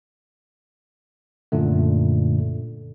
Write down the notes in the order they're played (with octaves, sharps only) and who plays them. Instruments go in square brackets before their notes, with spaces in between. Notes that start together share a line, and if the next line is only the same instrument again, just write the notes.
[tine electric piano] F#2 A#2 D3 A3